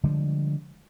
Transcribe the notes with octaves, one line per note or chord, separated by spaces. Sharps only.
D3 F3 G3 G#3